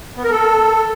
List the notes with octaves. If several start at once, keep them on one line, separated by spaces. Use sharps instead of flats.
B3
A#4
A4